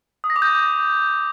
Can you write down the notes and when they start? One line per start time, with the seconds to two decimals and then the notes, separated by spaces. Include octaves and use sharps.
0.24 D#6
0.30 A#6
0.36 D6
0.42 G6